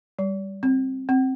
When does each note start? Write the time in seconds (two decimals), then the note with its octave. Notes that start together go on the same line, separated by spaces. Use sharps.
0.19 G3
0.63 C4
1.09 C4